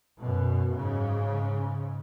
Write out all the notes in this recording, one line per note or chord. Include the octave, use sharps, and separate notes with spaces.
F#2 B2
G#2 C#3